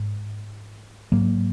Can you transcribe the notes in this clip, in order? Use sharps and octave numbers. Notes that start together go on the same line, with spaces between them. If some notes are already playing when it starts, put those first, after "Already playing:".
Already playing: G#2
G#2 F#3 A#3